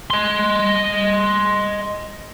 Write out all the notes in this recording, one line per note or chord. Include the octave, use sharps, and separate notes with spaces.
D#5 C6